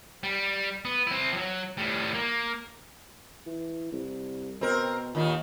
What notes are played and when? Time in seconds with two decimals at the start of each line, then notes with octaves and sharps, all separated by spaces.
0.23 G3
0.85 B3
1.07 C4 E4
1.33 F3 F#3
1.78 A2 G3
2.14 A#3
3.46 E3
3.92 C2
4.61 B2 C4 A#4
5.15 D#2 A#2 D#3